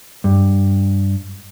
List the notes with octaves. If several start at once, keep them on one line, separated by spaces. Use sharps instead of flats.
G2